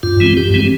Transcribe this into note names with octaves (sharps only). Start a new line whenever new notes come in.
G2 F4
E3 G#3 C4
G2 G4
E3 G#3 C4